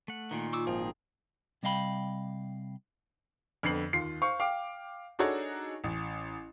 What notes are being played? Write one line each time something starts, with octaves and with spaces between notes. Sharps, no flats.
A3 F#5
A#2 D#3
F4 C#6 D6 E6
G#1 F3 G#4 G5 A#5
C3 G3 D#5 F5 G5 B5
F2 D3 B3 C7 F#7
D#2 F4 C7
C5 F5 C#6
F5 G5 D6
D4 D#4 F#4 G#4 A4 C#5
A1